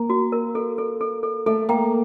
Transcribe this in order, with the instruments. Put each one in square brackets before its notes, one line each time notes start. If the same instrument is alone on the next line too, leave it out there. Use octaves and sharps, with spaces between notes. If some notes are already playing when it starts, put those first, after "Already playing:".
Already playing: [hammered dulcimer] A#3
[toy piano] F#4
A#4
A4
A4
A4
A4
[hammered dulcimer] A3 [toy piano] A4
[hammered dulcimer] A#3 [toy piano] G5